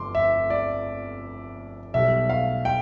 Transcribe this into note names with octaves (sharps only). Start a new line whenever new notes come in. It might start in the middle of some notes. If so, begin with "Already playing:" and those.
Already playing: G1 F2 C6 D6
E5
D5
B1 B2 G3 E5
F5
G5